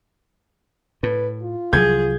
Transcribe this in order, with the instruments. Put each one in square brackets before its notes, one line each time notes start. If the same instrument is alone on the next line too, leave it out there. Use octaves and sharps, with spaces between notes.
[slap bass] A2 [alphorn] B4
[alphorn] F4
[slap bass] C2 F3 F#3 [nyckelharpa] G#4 [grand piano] G6 G#6